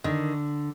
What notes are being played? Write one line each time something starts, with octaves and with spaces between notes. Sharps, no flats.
D3 D#3